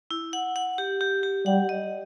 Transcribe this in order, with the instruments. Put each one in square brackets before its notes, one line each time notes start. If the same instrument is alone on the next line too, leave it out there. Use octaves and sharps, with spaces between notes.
[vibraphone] E4
F#5
F#5
G4
G4
G4
[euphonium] G3 [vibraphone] F#5
[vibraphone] D#5